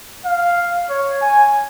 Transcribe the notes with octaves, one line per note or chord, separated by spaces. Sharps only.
F5
C#5
G#5